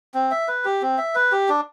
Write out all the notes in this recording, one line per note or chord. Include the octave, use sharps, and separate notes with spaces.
C4
E5
B4
G4
C4
E5
B4
G4
D4